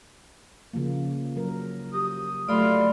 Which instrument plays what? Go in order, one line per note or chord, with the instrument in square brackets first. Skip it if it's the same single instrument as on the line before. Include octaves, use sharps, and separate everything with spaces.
[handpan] C#3 F3 A#3
F#3 A#4
[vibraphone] G4 [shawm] D#6
[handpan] F#3 A3 [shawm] F4 [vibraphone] D5 B5 C6